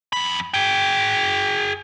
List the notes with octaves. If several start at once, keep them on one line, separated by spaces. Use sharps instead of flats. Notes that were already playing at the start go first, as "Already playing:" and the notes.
F2 B5
G#4 G5